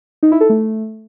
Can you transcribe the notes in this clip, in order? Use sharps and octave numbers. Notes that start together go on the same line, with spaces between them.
D#4
E4
A4
A3